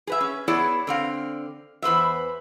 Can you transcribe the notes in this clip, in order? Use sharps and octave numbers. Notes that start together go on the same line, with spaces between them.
G#4 B4 E5
C#4
B3 E4 G#4 B4 C#5 D5
D3 C4 F5
E2 B4 C5 E5